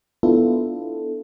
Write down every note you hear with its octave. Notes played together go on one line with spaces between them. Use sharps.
B3 D4 E4 F4 A4